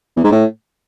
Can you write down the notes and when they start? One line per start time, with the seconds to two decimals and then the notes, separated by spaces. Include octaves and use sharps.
0.16 E2
0.24 G#2
0.31 A2